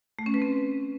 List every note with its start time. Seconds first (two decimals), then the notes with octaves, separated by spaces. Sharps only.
0.19 A3
0.26 C#4
0.34 B4
0.42 C4